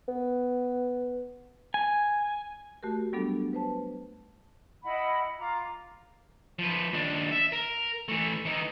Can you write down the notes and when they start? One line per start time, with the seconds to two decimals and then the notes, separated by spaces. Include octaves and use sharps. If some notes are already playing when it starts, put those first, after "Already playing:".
0.08 B3
1.74 G#5
2.83 A3 F#4 G4 A#4
3.13 F#3 G3 B3 D4 A4
3.53 B4 C5 A5
4.83 E4 D#5 F#5 B5
5.39 F4 A#5 D6
6.59 F3 B4
6.93 D#2 D4
7.31 E5
7.52 A#4
8.08 E3 A3
8.45 E3 D#4